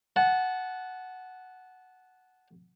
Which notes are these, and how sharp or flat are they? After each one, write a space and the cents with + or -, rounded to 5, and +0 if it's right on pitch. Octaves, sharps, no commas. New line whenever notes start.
F#5 +0 A5 -25